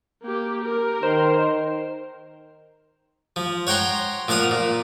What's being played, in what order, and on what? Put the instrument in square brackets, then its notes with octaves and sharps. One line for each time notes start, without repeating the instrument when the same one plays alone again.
[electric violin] A#3 G4
A#4
[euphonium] D#3 [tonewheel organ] C5
[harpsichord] F3
C#5 F#5 G5 A#5 C6
A#2 F3 F5 F#5 D#6
A#2